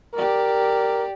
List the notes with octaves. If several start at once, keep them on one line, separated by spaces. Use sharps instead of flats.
G4 A#4 D5